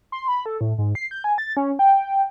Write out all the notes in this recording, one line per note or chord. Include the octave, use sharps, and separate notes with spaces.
C6
B5
A4
A2
G#2
C7
G6
G#5
A6
C#4
G5